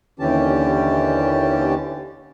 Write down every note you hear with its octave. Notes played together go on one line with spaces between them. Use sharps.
D#2 D3 E3 C#4 G4 A5